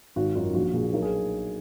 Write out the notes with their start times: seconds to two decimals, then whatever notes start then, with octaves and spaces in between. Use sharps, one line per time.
0.16 G#1 F#4
0.35 F#2 D#3 F4
0.54 A#1 F#4
0.74 A#2 G#4
0.93 B1 A#4
1.02 G#4